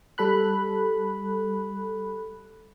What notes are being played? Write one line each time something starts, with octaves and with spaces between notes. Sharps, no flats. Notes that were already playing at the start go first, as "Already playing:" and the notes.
G3 A4 B5 F#6